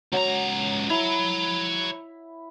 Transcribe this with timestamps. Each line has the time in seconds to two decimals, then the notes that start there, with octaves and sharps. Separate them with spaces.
0.12 C#2 F#3 A#5
0.90 E4 C#5 A#5